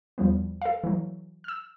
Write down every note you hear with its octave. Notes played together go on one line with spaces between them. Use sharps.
E2 F3 G3 B3
A4 F5
E3 F#3
E6 F6